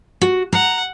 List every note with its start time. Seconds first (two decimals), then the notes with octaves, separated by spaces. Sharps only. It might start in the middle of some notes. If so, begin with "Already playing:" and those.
0.21 F#4
0.53 F#5 A#5